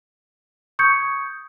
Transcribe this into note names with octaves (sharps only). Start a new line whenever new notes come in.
C#6 D#6 G6 G#6 C#7